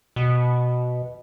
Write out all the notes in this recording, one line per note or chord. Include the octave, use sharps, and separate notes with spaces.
B2